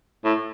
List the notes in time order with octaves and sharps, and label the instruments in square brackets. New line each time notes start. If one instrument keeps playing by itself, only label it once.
[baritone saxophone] A2